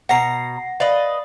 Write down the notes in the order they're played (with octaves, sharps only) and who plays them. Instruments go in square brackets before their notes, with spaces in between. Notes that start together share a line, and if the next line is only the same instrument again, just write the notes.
[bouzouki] B2 A#5 [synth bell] F#5 A#6 C7
[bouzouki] B4 D#5 [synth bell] D5 F5